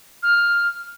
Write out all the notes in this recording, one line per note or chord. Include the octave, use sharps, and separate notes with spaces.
F6